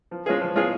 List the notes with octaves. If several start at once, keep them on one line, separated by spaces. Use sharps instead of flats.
F3
G#3 C#4 F4 G#4
F3
G#3 C#4 F4 G#4